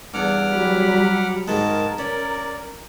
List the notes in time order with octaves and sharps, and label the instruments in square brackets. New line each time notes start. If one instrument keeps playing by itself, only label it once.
[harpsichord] E2 G2 [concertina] F#5 D6 F6
[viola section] F#3 G3 B5
[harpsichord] G#2 D#3 G#3 [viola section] A#4 [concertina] A5
[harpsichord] C#4 [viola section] A#4 [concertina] D5